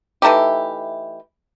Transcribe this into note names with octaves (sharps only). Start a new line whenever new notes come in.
E3 A3 D#4 G4